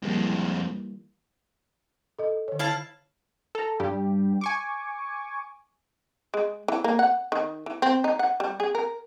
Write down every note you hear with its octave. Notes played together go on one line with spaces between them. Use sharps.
F2 E3 G3 G#3 A#3
A4 D#5
D3 C#5
E4 F5 A5
A4 A#5
G2 G3 G4
G#5 C#6 D6
G#3
E3
A#3
F#5
D#3
E3
C4
D#4
F#5
G3
G#4
A#4